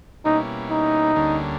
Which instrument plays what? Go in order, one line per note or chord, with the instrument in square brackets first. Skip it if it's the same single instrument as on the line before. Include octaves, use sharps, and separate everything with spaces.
[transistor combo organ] B2 G3 A#3 C#4 E4 [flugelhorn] D#4
[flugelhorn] D#4
[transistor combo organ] D2 D3 G3 A#3 C#4